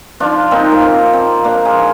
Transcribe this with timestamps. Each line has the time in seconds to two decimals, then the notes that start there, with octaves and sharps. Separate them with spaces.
0.20 F3 D4 F4
0.51 A#2 C4 D#4
0.72 A#3
0.82 A#2 C4
1.13 F3 C4
1.44 A#2 A#3 D4
1.65 F4 G#4
1.76 F3